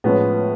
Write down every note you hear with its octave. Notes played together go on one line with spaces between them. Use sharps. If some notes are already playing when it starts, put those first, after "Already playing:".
A2 F3 G#3 B3 C#4